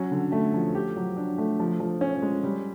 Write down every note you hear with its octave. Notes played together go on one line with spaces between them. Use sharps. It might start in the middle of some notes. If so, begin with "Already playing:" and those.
Already playing: F#3 C#4
D3
A3
F3
G4
F#3
D4
A3
F3
F3
C#4
G#3
G3